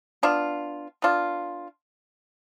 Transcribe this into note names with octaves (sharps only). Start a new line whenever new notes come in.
B3 D4 F4
B3 D4 F4